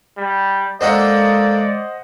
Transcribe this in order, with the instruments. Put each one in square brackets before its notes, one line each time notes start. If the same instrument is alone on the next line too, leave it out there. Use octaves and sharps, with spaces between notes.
[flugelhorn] G3
[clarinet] G#3 [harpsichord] A#3 D4 A4 [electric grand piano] C5 D#5 F#5 [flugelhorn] D5